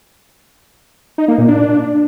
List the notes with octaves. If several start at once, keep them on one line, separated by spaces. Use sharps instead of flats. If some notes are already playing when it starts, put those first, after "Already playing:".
D#4
A#3
A#2
D4